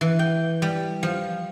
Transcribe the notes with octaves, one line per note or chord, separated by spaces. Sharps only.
E3
G5
G3
F3